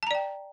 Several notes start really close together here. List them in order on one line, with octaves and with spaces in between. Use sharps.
A5 A#5 D5 G5